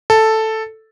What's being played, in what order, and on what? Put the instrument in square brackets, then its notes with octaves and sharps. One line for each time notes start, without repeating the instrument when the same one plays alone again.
[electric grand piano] A4